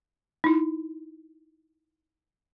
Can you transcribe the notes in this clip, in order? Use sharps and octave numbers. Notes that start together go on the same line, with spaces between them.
D#4 E4